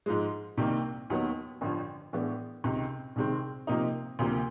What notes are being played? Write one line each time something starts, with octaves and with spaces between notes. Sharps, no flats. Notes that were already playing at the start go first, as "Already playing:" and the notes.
G#2 F3 G#3
C2 C3 D#3 G3 A#3
D#2 D#3 F#3 B3
A1 G2 D3 F3
A2 E3 G#3 B3 D4
C#2 C3 D#3
C2 C3 D#3 G#3 C4
C3 F3 A#3 D#4
D2 C3 F3 A#3